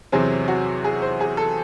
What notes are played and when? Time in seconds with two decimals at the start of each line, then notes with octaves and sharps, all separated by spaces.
0.12 E2 C3 F#3 C4 G#4
0.48 F#4
0.84 G#4
1.02 C5
1.21 G#4
1.37 A4